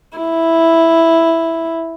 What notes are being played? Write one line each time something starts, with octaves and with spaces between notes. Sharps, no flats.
E4